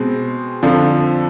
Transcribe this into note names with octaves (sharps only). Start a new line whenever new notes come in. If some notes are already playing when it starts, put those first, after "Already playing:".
Already playing: B2 G#3 C4
F2 D3 F3